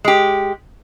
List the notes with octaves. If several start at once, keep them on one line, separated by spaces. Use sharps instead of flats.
G#3 G4